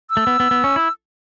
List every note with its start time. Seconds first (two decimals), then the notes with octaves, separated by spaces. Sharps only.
0.10 E6
0.17 A3
0.27 B3
0.40 B3
0.51 B3
0.64 C#4
0.76 E4